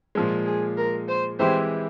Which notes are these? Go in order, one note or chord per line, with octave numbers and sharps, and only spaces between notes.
A#2 F3 G#3
G#4
A#4
C5
E3 G#3 C4 E4 G4 C5